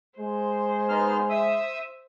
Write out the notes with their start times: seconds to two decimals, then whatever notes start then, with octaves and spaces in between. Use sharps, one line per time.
0.19 G#3 C5
0.89 B3 D#4 F6
1.30 E5 D#6 E6